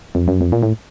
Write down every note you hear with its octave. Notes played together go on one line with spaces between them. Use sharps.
F2
F#2
F2
A#2
A2